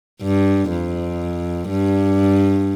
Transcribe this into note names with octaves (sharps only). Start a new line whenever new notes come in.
G2
F2
G2